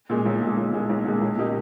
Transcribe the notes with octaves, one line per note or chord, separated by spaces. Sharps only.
A#2 G#3
B1
A#2 G#3
B1
A#2 G#3
B1
A#2 G#3
B1
A#2 A#3 D#4 G4